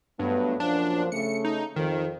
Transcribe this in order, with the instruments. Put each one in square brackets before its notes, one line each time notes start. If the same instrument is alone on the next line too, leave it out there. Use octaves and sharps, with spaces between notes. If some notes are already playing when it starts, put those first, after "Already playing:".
[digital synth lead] G2 [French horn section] F#3 A3 B3
[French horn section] F#2 A#2 F3 [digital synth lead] D4
[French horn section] C#3 A3 [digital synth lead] C#7
[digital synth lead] D#4
[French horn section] F2 [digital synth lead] D#3